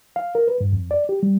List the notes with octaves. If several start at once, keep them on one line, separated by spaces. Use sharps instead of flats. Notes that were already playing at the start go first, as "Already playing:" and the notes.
F5
A#4
B4
G2
F2
D5
G4
G3